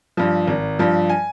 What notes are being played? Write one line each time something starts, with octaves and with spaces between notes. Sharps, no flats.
G2 F3
G#1
G2 F3
G#5